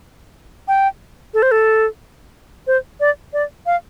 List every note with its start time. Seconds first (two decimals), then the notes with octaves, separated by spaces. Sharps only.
0.68 G5
1.34 A4
1.42 C5
1.51 A4
2.67 C5
3.00 D5
3.33 D5
3.66 F5